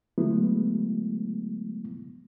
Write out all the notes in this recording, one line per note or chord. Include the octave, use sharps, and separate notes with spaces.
D3 F#3 G#3 A3 B3 E4